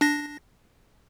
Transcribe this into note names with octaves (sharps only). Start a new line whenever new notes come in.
D4 A#6